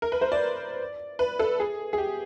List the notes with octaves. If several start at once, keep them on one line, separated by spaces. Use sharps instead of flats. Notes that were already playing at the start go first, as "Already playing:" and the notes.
A#4
B4
C5
D5
B4
A4
G#4
G#4
G4